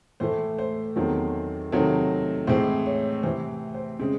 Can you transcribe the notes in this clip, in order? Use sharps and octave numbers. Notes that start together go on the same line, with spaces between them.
A2 E3 A3 C5
C5
E2 D#3 F#3 A3 C4
C3 D#3 F#3 A3 C4
A2 E3 G#3 C4 C5
C#5
C3 E3 C4 C5
C5
C#3 G#3 C4